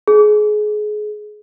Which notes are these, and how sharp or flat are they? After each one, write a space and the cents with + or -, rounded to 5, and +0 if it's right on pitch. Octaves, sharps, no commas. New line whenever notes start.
G#4 +25